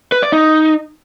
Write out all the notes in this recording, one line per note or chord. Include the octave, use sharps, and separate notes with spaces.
B4
D5
D#4